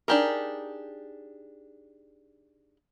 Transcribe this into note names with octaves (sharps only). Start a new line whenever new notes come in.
D4 D#4 G4 G#4 A#4